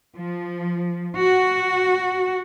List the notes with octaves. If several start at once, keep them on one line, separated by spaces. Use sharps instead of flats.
F3
F#4